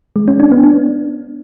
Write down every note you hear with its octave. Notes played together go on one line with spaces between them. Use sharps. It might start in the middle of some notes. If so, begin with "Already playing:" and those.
G#3
C#4
D4
B3
D4